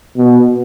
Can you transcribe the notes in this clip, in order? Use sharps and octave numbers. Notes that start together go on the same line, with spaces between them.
B2